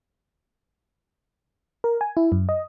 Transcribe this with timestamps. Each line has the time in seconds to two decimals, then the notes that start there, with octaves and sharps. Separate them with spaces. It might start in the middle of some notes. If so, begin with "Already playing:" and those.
1.84 A#4
2.01 G#5
2.17 E4
2.32 F#2
2.49 D#5